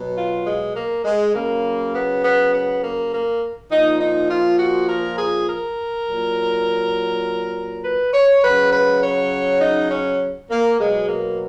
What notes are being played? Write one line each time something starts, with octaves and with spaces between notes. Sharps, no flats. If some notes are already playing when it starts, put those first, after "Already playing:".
Already playing: B2 F#3
F4
G#3
A#3
G#3
C#3 F#3 A#3
B3
B3
B3
A#3
A#3
A#2 F3 D#4
D#4
F4
F#4
A#4
G#4
A#4
A#2 F#3
B4
C#5
C#3 F#3 B4
B4
C#5
D#4
C#4
A#3
B2 F#3 G#3
A#3